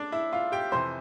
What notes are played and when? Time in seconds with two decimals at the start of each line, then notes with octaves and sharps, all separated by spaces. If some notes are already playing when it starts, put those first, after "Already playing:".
Already playing: D4 D5
0.12 E4 E5
0.33 F4 F5
0.52 G4 G5
0.72 F2 C3 E3 C5 C6